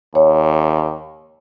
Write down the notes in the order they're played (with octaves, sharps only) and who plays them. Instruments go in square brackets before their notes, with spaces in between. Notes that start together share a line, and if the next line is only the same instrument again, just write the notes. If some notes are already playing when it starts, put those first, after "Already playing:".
[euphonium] D#2 [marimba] C#5